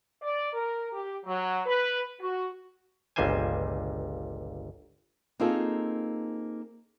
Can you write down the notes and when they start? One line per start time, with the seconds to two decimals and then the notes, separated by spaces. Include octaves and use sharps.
0.23 D5
0.53 A#4
0.92 G4
1.25 F#3
1.65 B4
2.20 F#4
3.16 G1 C#2 A#2 G3 C5 G#5
5.40 A#3 C4 D#4 F4 G#4 A4